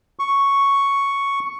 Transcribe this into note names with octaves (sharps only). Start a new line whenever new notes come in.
C#6